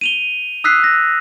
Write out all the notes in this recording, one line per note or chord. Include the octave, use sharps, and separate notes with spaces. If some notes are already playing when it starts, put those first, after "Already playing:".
D#7 F7 G7
D#6 E6 F#6 B6 C7
A#6